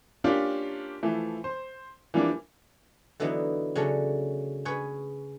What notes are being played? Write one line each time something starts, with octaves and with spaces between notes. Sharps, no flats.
A#3 C#4 D4 F4 G4
E3 F3 A3
C5
E3 F3 G3 A#3 D4
D3 E3 F#3 B3 D#4 E4
C#3 F#3 A3 C#4 D4
C#4 G#4 B4 C#5